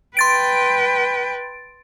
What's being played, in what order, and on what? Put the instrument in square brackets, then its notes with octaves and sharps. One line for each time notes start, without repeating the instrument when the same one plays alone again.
[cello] B4 G5 [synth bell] C6 A6 D7